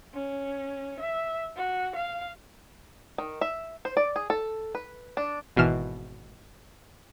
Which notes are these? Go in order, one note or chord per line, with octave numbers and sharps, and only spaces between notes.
C#4
E5
F#4
F5
D#3
E5
C5
D5
G#4
A4
B4
D4
G#1 B2 E3 F6 E7